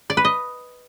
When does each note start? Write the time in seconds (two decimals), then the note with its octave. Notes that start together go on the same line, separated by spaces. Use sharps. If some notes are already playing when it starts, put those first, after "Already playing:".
0.10 D5
0.17 B4
0.25 D#5